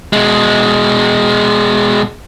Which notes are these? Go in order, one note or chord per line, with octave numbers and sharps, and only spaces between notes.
B2 G#3